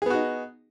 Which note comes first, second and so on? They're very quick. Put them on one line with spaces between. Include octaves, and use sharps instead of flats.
G#4 B3 F#4 D#4